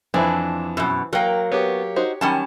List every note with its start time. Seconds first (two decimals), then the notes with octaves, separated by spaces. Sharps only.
0.14 F2 E3 C4 D4 E4
0.77 F#2 B2
1.13 F#3 A#3 A#4 G5
1.52 B3 G4 C#5
1.96 D#4 F#4 C5
2.21 D#3 F#3 G3 C#4 A5